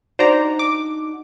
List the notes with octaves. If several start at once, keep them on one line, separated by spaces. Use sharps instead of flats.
D4 D#4 F#4 C5 D5 A#5
D6